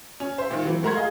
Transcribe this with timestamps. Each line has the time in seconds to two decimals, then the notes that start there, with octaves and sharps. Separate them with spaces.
0.20 C#4
0.38 C5 E5
0.50 A#2 D#3
0.65 E3 F#3 C4
0.83 A3 A#4 F#5 A#5 C6 G#6
0.95 G#4 D#5 F5